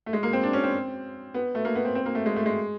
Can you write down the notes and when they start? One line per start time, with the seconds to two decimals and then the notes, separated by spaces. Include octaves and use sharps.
0.06 A3
0.13 G#3
0.23 A#3
0.33 C4
0.43 D4
0.53 C#4
0.64 C4
1.34 B3
1.55 A3
1.65 A#3
1.75 B3
1.85 C4
1.95 C4
2.06 A#3
2.15 A3
2.26 G#3
2.36 A3
2.46 G#3